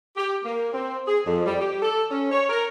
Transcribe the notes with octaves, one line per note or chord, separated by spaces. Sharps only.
G4
A#3
C4
G#4
F2
G3
G4
A4
C#4
C#5
A#4